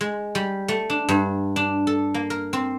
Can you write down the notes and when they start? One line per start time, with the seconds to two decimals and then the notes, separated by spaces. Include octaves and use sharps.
0.01 G#3
0.35 G3
0.68 A3
0.90 D4
1.09 G2
1.56 D4
1.87 A4
2.14 A#3
2.30 A#4
2.53 C4